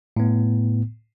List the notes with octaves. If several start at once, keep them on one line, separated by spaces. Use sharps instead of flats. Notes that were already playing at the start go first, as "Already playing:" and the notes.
A2 B3